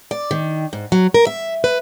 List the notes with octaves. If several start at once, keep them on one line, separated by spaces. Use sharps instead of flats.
D5
D#3
G#2
F#3
A#4
E5
B4